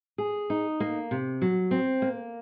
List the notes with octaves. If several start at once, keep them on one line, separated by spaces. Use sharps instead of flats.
G#4
D#4
A#3
C3
F#3
C4
A#3